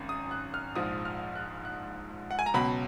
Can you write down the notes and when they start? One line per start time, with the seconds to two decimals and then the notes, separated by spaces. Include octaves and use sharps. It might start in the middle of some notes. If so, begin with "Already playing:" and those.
Already playing: G#1 F#2
0.09 D#6
0.31 F#6
0.54 F6
0.76 A#1 G#2 F3 D#6
1.05 F6
1.35 F#6
1.65 F#6
2.31 F#5
2.39 G#5
2.46 A#5
2.54 C#2 B2 F#3 B5